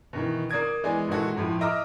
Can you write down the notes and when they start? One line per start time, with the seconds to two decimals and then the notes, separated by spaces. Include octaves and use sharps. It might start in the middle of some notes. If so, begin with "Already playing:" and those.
0.13 B2 D#3 E3
0.49 A#3 D5 D#6 G#6 D7
0.84 E3 G#3 B3 D5 G#5
1.09 A#2 D#3 E3 G#3 F#4 A4
1.36 F2 A2 F3
1.61 D#5 E5 A#5 D6 D#6 F6